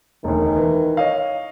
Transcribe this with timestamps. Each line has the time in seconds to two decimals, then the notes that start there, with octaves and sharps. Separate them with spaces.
0.24 E1 D2 D#3
0.56 E3
0.97 C#5 D#5 F5